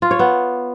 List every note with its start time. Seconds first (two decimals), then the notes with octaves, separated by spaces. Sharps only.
0.02 F4
0.11 C#5
0.19 B3